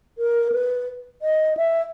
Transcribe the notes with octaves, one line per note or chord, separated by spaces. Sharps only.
A#4
B4
D#5
E5